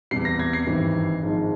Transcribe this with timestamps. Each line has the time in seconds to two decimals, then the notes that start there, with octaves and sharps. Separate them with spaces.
0.11 E2 C3 G3 C7
0.25 A#6
0.39 G#6
0.53 C7
0.66 G#1 G2 E3 G3
1.22 G#1 G#2 F3 G#3